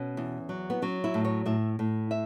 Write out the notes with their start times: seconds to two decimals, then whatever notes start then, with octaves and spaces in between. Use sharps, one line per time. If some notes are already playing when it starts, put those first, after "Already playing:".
Already playing: B2 C#4
0.17 E2
0.49 F#3
0.70 B3
0.82 F#3 C#4
1.04 E4
1.14 A2
1.25 C#5
1.46 A2 E5
1.79 A2
2.11 E5